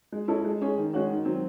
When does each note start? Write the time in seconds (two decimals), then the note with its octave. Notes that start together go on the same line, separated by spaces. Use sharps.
0.12 G#3
0.28 C#4 E4 A4 D#5
0.45 G#3
0.61 C#4 G#4 C#5
0.78 D#3
0.93 G#3 C#4 F#4 C#5
1.09 D#3
1.25 F#3 C4